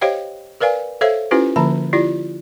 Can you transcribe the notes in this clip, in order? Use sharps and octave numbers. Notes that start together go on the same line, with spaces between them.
G4 C5 C#5 D#5 F5 G5
A#4 B4 D5 F5 G#5
A4 C5 C#5 E5 F5
C#4 E4 F4 G4 B4 C5
D3 F3 A#3 A5 A#5
E4 F4 G4 D5